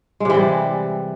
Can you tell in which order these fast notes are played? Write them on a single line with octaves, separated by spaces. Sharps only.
G#3 C3 E3 G3